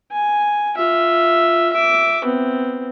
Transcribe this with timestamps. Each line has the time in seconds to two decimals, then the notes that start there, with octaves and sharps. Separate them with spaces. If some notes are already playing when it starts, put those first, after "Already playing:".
0.12 G#5
0.76 F4 E5
1.73 E5 D6
2.24 B3 C4